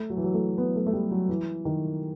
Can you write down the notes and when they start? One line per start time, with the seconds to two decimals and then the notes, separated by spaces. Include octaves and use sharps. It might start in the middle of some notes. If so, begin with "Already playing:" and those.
Already playing: A3
0.10 F#3
0.17 E3
0.24 F#3
0.34 A3
0.58 B3
0.75 A3
0.86 A3
0.93 G3
1.11 F#3
1.29 E3
1.65 D#3